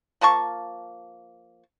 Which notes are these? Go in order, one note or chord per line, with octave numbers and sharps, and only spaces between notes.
F3 A#3 A5 C#6